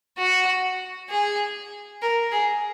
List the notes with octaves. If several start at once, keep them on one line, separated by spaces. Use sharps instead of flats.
F#4
G#4
A#4
G#4